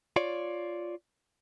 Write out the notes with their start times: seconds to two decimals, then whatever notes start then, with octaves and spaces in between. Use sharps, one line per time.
0.16 F4 C#5 D5